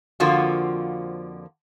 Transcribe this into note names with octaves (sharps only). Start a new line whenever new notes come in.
F2 D3 F3 A#3 F4 F#4